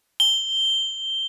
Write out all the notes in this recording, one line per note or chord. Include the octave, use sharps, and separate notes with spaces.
G7